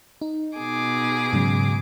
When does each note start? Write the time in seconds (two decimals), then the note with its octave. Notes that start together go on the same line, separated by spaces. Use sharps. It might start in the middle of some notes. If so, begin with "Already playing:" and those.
0.21 D#4
0.57 B2 G#4 D6
1.33 G#2 C#3 F#3